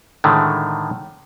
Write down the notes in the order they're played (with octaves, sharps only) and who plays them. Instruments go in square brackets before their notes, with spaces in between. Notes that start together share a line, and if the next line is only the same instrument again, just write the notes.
[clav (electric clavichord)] A2 D3 D#3 G#3 A3